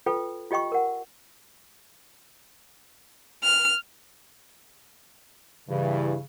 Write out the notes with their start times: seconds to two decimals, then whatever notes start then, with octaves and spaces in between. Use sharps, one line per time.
0.06 F4 A4 B4 G5
0.51 F4 G4 D#5 G5 C#6
0.72 A#4 F#5
3.44 F6
5.69 G2 C#3 E3